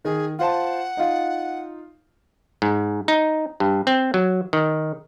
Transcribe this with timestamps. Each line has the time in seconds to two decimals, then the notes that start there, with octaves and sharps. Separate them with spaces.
0.05 D#3 G#4
0.39 F4 C5 F#5 A5
0.97 D#4 F4
2.62 G#2
3.08 D#4
3.60 G2
3.87 C4
4.14 F#3
4.53 D#3